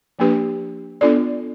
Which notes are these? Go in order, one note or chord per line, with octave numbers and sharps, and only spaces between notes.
F3 A#3 D4 G4 B4
B3 D4 F4 A4 D5